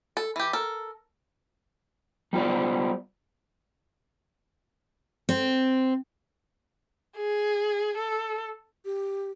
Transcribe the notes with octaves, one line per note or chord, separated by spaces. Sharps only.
A4
E3 G4
A4 A#4
G3 B3 F4 F#4 C5 D5
C4
G#4
A4
G4